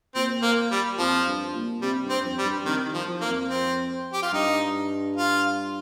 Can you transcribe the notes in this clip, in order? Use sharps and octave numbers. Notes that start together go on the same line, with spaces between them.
A#2 C4
A#3
G3
F2 F3
G2
A#2
C3 G3
G2
C4
F2
G3
G2
C3 D#3
D#3
F3
F3
A#3
F2
C4
G4
F4
G2 D#4
F4